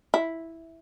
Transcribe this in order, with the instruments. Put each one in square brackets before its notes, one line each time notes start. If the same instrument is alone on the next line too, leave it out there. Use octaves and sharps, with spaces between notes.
[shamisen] E4